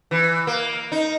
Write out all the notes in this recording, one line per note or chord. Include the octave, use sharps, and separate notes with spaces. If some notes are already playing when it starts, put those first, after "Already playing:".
E3
A#3
D#4